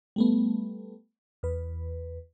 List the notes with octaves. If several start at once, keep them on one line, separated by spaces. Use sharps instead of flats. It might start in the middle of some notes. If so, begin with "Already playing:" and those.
G3 A3 B3
E2 B4